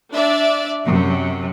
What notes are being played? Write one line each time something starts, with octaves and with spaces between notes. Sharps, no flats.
D4 D5 E5
F#2 C3